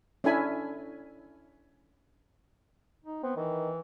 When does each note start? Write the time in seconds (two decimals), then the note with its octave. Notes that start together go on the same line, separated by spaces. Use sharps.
0.24 C#4 D4 E4 A4 G#5 B5
3.05 D#4
3.23 B3 C4
3.37 D#3 E3